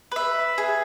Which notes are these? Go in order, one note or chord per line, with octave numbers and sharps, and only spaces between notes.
B4 E5
G#4